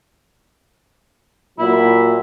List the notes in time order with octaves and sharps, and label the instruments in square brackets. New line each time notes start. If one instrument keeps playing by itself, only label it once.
[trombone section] A#2 F#3 [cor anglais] E4